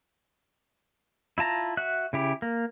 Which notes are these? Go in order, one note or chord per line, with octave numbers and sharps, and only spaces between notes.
E4 F4 A5 A#5
F#4 E5 F#6
C#3 E4 G4
A#3